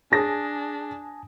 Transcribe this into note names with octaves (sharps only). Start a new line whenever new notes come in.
D4 G#4 G#5 A5 D#6 A#6